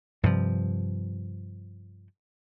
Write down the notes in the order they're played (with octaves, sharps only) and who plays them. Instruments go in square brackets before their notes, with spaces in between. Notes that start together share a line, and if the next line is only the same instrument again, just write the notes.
[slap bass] G2 C3 F3